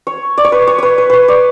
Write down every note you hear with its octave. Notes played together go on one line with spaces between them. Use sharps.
C#5
D5
C#5
B4
C#5
B4 C#5
B4
B4 C#5
D5